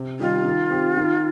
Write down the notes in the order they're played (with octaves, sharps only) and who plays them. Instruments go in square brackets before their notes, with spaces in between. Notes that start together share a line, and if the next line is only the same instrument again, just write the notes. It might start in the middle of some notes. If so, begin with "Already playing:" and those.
Already playing: [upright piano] C3
[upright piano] D#3 G3 D#4 G4 [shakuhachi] F4
[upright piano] D#3
C4 G4
D#3